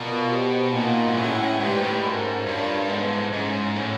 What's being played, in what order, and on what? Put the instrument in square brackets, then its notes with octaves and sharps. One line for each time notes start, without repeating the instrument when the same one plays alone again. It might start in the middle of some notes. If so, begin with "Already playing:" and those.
Already playing: [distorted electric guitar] B2 [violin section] F4 A#4 D5
[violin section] B3 D#4 G4 C5
[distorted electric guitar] A#2 [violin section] D#4 F#4 A#4 D#5
[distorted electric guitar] G#2
[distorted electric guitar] A2 [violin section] C#4 E4 G#4 C#5 F#5
[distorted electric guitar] G#2 [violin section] G4 B4 D5 G5
[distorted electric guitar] A2
[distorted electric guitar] G#2 [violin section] A3 C#4 F#4 A#4
[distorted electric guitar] G2 [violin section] F4 A#4 C#5 F5 A5
[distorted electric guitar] G#2 [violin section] B3 E4 A4
[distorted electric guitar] G#2 [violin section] C#4 E4 G#4
[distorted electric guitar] A2